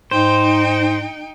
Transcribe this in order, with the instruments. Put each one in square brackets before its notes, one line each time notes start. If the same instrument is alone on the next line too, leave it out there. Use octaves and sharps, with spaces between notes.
[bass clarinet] G#2 [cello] D#4 G5 [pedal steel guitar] C5